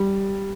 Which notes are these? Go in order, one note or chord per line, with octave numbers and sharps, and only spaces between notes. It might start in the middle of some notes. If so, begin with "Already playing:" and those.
Already playing: G3